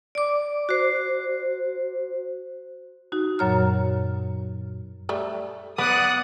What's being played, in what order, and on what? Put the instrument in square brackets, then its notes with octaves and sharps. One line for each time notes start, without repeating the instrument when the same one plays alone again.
[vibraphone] D5 D6
F#4 C5
[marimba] D#4 F#4
F#2 A#2 F#3 C#5 A#5 F6
[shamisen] G3 A3
[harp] B3 [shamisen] B4 [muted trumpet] D5 [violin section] D#6 F#6 C#7